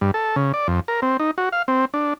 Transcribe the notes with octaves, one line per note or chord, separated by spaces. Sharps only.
G2
A4
C#3
D5
F2
A#4
C4
D#4
F#4
F5
C4
D4